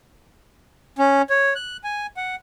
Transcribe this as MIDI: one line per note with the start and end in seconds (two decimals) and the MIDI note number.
0.99 1.22 61
1.30 1.54 73
1.55 1.77 90
1.84 2.07 80
2.17 2.36 78